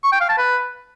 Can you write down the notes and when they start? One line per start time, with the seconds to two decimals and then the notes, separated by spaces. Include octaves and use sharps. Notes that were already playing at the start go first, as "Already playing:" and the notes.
0.04 C#6
0.12 G5
0.21 F5
0.29 A5
0.38 B4